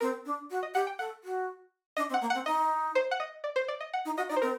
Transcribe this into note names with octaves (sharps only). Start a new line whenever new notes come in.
C4 A#4
D4
F#4
D#5
G4 F#5
G5
A4 F#5
F#4
D4 D#5
C4
F#5
A#3
C4 F#5
D#4 D#5
C5
F#5
D#5
D5
C5
D5
D#5
F#5
D#4
F#4 D#5
D#4 D5
C5
C4 A#4